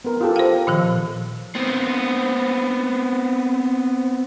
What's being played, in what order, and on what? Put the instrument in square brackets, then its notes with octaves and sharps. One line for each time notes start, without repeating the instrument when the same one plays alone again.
[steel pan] B3 A#4
F4 G4 A4
[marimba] C5 F5
A#2 D#3 F3
[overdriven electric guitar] B3 C4